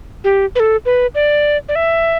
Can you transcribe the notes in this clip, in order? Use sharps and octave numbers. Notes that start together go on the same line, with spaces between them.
G4
B4
A4
B4
D5
D5
E5